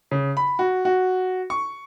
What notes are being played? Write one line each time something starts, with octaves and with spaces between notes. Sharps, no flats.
C#3
B5
F#4
F#4
C#6